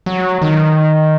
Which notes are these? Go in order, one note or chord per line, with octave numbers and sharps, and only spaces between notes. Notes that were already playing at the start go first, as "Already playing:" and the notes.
F#3
D#3